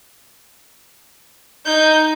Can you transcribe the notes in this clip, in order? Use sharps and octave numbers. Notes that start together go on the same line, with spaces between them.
D#4 G6